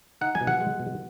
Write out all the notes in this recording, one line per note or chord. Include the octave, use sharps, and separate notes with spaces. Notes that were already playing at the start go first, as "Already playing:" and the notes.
D#4 F#5
G#5
B2
F#5
G#3
B2